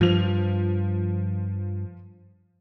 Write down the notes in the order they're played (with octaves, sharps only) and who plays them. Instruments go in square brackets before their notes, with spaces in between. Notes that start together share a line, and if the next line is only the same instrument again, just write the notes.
[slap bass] G2 [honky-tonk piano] F3 F7